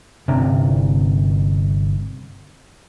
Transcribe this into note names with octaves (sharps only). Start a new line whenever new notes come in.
G1 C3 C4 D4